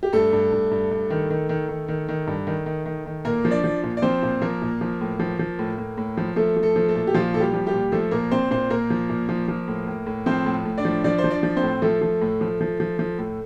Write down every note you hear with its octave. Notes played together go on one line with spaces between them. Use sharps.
G4
G2 A3 A4
G2
G2
G2
G2
D#3
D#3
D#3
D#3
D#3
D#3
G2
D#3
D#3
D#3
D#3
A#2 A#3 A#4
F3
D4 D5
F3
A#2
D5
F3 C4 C5
A#2
F3 A#3 A#4
A#2
F3
A2
F3
F3
A2
A2
A2
F3
F3 A3 A4
F3
A3 A4
F3
A3 A4
A#2
G4
A#2 F3 F4
A#2 A4
G3 G4
F3
G3 G4
A#2
F3 A3 A4
A#2 A#3 A#4
A#2 C4 C5
A#2 C4 C5
A#2 A#3 A#4
F3
A#2
F3
F3
A2
A2
A2
F3 C4 C5
A2
A2
D4 D5
F3
F3 D4 D5
C5
F3
D4 D5
F3
C4 C5
A2
F3 A3 A4
F3
A2
F3
F3
F3
F3
A2